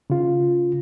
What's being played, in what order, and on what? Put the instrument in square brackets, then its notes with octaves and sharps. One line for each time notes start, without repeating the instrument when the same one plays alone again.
[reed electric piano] C#3 F4